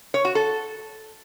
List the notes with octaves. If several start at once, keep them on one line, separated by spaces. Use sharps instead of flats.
C#5
F#4
A4